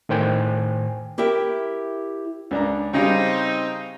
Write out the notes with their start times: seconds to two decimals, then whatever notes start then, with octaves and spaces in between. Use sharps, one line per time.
0.09 A2 D#3 C5 G5 G#5
1.18 E4 G4 A#4 E5 G5
2.51 C#2 D4 A#5
2.94 C#3 G3 C4 D#4